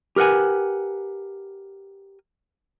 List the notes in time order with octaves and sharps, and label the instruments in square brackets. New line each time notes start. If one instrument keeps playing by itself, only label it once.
[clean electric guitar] G4 A#4 B4 F#5 G#5